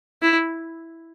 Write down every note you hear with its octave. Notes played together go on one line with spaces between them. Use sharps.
E4